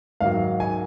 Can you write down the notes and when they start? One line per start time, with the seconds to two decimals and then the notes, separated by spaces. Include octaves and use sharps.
0.21 G#2 D#3 F#3 F5
0.60 G#5